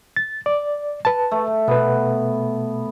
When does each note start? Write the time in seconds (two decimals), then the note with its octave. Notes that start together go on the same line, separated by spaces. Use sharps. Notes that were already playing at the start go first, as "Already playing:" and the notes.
0.16 A6
0.46 D5
1.05 B4 A5
1.31 A3
1.68 B2 B3 B4